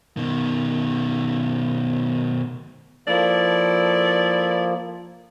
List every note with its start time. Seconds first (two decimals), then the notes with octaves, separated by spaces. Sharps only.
0.17 B2 D#3
3.08 F3 A#3 E4 A4 D5